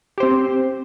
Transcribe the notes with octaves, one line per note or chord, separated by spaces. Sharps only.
C4 G4 C5